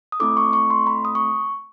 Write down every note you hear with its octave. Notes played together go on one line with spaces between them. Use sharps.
D#6
A3 C4 E4 A4 D6
C#6
C#6
C6
B5
D#6
C#6